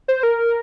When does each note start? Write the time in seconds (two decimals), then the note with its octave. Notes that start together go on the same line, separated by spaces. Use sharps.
0.08 C5
0.23 A#4